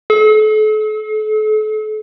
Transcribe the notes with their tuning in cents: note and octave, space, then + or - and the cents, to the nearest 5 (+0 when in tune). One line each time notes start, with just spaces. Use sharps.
A4 -40